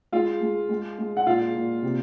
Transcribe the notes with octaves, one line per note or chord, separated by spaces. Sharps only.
G#3 F4 F5
G#3
G#3
G#3
F#5
A#2 F4 F5
A#2
C3